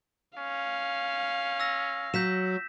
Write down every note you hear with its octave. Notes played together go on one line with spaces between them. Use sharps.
C#4 F5
E6 A#6
F#3 G6 B6 E7